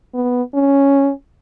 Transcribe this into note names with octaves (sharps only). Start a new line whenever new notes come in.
B3
C#4